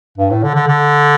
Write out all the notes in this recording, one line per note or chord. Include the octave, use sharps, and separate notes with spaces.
G2
A2
D3
D3
D3